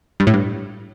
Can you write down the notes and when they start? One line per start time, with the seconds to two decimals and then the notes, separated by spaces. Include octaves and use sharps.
0.20 G2
0.27 A2
0.34 G2